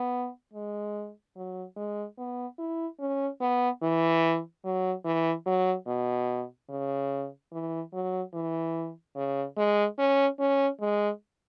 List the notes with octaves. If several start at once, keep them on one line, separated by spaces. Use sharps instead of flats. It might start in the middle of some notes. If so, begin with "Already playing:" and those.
Already playing: B3
G#3
F#3
G#3
B3
E4
C#4
B3
E3
F#3
E3
F#3
B2
C#3
E3
F#3
E3
C#3
G#3
C#4
C#4
G#3